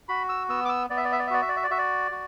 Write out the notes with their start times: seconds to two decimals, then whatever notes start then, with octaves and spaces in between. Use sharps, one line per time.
0.08 F#4 B5
0.29 E6
0.49 B3 E6
0.65 D6
0.69 E6
0.90 B3 D5
0.97 E5
1.04 D5
1.12 E5
1.19 D5
1.27 E5
1.30 F#4 D5
1.42 E5
1.49 D5
1.56 E5
1.64 D5
1.71 F#4 E5
1.78 D5
2.11 F#4